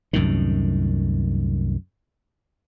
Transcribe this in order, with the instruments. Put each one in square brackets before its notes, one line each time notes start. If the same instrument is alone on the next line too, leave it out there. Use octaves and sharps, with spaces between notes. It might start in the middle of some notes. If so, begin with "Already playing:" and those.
[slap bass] C2 F#2 A2 D#3